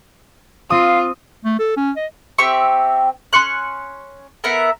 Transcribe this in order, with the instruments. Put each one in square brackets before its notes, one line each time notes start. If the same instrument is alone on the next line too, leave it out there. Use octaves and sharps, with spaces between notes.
[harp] C4 D#6 [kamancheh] F4 [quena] F5
[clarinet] A3
A4
C#4
D#5
[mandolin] C4 G4 E5 C#6
C#4 C6 C#6 F#6
B3 A#4 E5 F#5